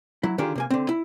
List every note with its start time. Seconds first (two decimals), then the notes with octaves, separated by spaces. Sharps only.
0.23 F#3 E4
0.38 D3 D#3 D4 F4 G4 G#4
0.55 C3 A#3 G#5
0.70 D3 C4
0.89 E4